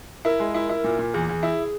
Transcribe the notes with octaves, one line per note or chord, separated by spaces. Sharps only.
E4 A#4
G#3
E4
E4
A#2
A#2
E2 G#4
E2
E4